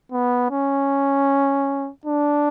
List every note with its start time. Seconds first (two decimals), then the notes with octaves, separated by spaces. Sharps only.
0.12 B3
0.51 C#4
2.05 D4